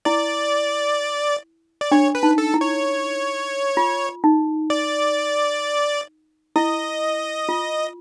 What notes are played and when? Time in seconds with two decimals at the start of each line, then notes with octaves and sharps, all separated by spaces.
0.05 E4 D5
1.81 D5
1.92 D4 C#5
2.15 B4
2.23 D#4
2.38 A4
2.54 E4
2.61 C#5
3.77 F4
4.24 D#4
4.70 D5
6.56 E4 D#5
7.49 F4